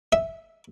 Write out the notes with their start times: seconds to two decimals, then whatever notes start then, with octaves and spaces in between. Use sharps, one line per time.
0.12 E5